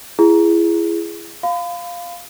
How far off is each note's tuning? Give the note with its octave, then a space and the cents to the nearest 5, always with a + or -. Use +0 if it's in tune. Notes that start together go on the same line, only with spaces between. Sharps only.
E4 +35 G#4 +0
F5 +0 B5 +40